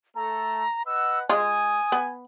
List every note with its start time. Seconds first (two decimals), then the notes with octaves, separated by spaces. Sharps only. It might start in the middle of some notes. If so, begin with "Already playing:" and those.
0.15 A3 A4 A#5
0.86 B4 D#5 F#5 E6
1.29 G#3 F4 G#5 D#6
1.92 B3